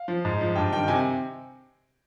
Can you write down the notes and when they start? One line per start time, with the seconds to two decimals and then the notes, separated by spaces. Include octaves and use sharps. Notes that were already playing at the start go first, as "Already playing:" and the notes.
Already playing: F5
0.08 F3
0.25 G#2
0.41 F3
0.56 G2 G5
0.73 D#3 G5
0.88 C3 G#5